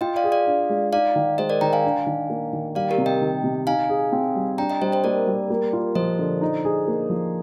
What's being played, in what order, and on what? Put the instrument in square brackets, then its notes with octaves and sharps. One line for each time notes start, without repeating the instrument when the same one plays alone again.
[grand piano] F4 [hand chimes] D#5 G5
[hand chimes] D5 F5
[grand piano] G#4
[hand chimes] D5 F5
[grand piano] D4
G#3
[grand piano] D#4 [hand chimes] D5 F5
[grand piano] D#3
[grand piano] G#3 [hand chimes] C5 D#5
[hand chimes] A#4 D5
[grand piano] D#3 [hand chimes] G5 A#5
[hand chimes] F5 G#5
[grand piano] D4
D#3
A#3
D#3
[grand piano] G3 [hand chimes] D5 F5
[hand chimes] G4 A#4
[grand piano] C3
[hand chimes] D#5 G5
[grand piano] D#3
C3
[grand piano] D#4 [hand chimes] F5 G#5
[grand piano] G#4
C4
G3
[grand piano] D4 [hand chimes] G5 A#5
[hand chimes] D#5 G5
[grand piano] G3 [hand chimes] C5 D#5
[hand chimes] C5 D#5
[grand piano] A#3 [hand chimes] A#4 D5
[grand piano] G3
A#3
F4
[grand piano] F3 [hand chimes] C5 D#5
[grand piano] D3
D#4
G#4
A#3
F3